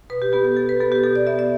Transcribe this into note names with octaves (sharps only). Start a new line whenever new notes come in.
B2 B4
G4
B3 G4
A4
B2 A4
B4
B3 A4
G4
B2 A4
D5
B3 E5
E5